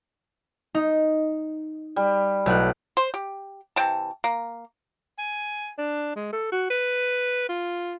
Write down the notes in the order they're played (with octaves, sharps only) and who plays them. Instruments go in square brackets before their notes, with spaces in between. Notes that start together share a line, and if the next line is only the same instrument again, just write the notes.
[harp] D#4
[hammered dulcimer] G3
[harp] B1 F#6 [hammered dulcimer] A2
[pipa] C5
G4
C3 E3 G5 A5
A#3
[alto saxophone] G#5
D4
G#3
A4
F#4
B4
F4